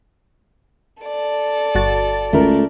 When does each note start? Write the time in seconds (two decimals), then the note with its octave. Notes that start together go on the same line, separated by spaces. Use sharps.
1.03 A4 D5
1.75 G1 F#4 A6
2.33 C#2 A3 A#4